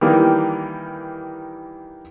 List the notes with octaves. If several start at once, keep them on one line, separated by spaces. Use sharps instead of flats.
D#3 E3 G3 A#3